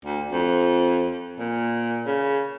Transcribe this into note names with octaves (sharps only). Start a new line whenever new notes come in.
D2
F2
A#2
C#3